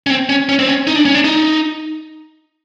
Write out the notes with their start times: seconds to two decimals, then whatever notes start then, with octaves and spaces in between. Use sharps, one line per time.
0.07 C#4
0.10 C4
0.29 C#4
0.49 C#4
0.59 C4
0.67 C#4
0.87 D#4
0.95 D4
1.05 C#4
1.14 D4
1.25 D#4